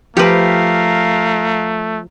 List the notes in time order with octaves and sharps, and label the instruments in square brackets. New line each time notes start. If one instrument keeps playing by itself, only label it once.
[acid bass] F3 [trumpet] A3 [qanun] G4 B4 [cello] A#4 F5